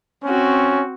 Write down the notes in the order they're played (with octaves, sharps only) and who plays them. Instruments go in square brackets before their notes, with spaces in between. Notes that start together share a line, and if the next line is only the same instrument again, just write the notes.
[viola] C4 F#4 [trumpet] C#4